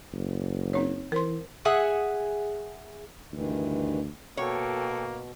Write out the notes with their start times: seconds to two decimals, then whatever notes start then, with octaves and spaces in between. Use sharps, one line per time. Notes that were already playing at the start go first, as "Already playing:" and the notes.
0.13 F#1
0.73 C4 D#4 C#5
1.12 E3 A#4 C5 C6
1.65 G#4 E5 F#5 G#5
3.32 D2 G2 D#3 E3
4.37 B2 A#3 A4 C#5 F#5 G5